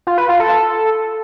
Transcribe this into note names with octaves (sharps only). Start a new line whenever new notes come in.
F4
B4
F4
A4